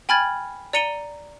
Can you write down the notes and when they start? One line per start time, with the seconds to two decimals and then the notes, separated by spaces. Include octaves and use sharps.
0.09 G5 G#5 B5 F6 G#6 A6
0.73 D5 A#5 C#7 D#7 G7